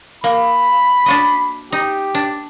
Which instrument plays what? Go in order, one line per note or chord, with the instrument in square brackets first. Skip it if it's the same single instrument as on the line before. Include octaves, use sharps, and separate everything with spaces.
[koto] A#3 [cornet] B5
[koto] D4 F#4 D#5
[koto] D#4 [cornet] G4
[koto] D4